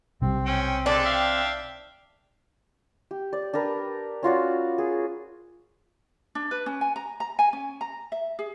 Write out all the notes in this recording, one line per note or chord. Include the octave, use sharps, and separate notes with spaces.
B1 C3 G3 C4
C#4 G5
G#3 A3 D4 A4
E5 F5 G5
G4
D5
D4 G4 A#4 B4
C#4 F4 F#4 D5
G#4
D4
B4
C#4
G#5
A#5
A#5
G#5
C#4
A#5
E5
G#4